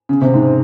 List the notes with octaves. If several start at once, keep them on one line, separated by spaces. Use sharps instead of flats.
C#3
C3
G#2